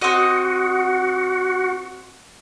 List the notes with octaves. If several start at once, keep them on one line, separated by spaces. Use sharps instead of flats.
C4 F#4 D#5 F#5